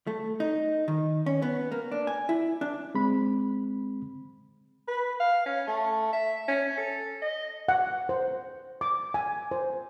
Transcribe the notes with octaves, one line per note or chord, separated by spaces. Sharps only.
A3
D#4
D#3
C#4
B3
A#3
D4
G#5
E4
D4
G#3 C4 B5
B4
F5
C#4
A3
E5
C#4
A4
D#5
F#5
C5
D6
G#5
C5